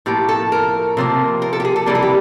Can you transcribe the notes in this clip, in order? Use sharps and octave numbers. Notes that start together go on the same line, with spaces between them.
A2 F3 A#3 G4
A4
A#4
C3 F3 A#3
A#4
A4
G4
G#4
A4
C3 E3 G3 A#3 A4
G#4
G4